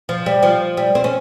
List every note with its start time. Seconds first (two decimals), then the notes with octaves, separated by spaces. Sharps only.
0.09 F3
0.26 G3
0.43 F3
0.77 G3
0.95 C4
1.04 C#4